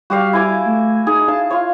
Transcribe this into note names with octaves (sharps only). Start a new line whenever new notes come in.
G3 F#4 G4 F5
E4 G#5 D6
A3
D#4 G#4
F5 A5
F4 C#5